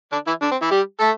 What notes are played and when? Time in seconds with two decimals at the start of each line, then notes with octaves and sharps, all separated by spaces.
0.12 D3 D4
0.27 E3 E4
0.42 D3 D4
0.52 C4
0.61 E3 E4
0.71 G3 G4
1.00 A3 A4